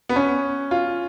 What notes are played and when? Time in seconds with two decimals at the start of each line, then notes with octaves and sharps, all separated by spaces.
0.09 B3
0.16 C#4
0.71 F4